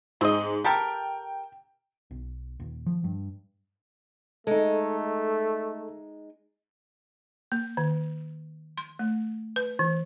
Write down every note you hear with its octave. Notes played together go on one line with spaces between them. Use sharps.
G#2 C4 D#5
G4 A4 A#4 G5
B1
D#1
F3
G2
G#3 A3 D#4 A4
A#3
D#3
C6
A3
B4
E3